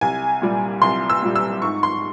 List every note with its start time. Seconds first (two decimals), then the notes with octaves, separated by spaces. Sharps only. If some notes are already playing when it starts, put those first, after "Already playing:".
0.01 C2 G#5
0.42 A#2 G3
0.82 C2 C6
1.10 E6
1.23 A#2 G3
1.36 E6
1.62 G#2 C#6
1.83 C6